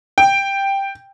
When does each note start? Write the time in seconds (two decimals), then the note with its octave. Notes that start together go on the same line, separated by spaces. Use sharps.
0.18 G5